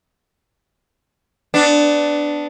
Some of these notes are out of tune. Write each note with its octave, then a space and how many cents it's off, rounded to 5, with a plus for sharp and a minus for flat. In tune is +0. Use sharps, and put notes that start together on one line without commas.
B3 +25 D4 +0